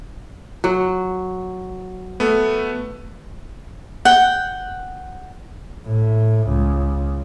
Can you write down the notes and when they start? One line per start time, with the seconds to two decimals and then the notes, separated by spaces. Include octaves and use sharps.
0.64 F#3
2.20 A3 B3
4.05 F#5 G5
5.87 A2
6.48 C#2